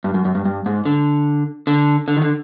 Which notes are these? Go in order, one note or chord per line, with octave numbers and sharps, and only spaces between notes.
G2
F#2
F#2
G2
G2
G#2
D3
D3
D3
D#3
D3